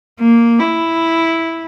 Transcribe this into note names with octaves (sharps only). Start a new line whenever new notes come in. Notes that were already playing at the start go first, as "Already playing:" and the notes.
A#3
E4